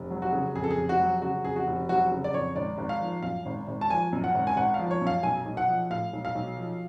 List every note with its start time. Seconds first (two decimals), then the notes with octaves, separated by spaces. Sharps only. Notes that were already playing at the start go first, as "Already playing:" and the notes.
Already playing: F1
0.11 F#3
0.22 F#4
0.33 C#3
0.55 F2 G#4
0.64 A4
0.71 G#4
0.77 F1
0.89 F#4
1.00 F#3
1.22 C#3 F#4
1.45 F2 G#4
1.56 F#4
1.67 F1
1.89 F#3 F#4
2.12 C#3
2.24 D5
2.34 F2 C#5
2.56 G#1 D5
2.78 G#1
2.89 F5
3.01 F3
3.23 F#2 F5
3.46 G#1
3.67 G#1
3.81 A5
3.90 F3 G#5
4.13 F#2
4.24 F#5
4.34 G#1
4.47 G#5
4.56 G#1 F#5
4.74 F5
4.79 F3
4.91 C#5
5.01 F#2
5.07 F5
5.23 B1 G#5
5.46 B1
5.57 F#5
5.68 F3
5.90 A2 F5
6.13 B1
6.25 F5
6.35 B1
6.57 F3